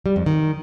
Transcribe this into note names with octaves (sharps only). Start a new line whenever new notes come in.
G3
F2
D#3